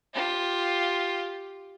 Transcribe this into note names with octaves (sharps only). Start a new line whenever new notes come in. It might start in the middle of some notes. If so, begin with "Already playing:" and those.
F4 G4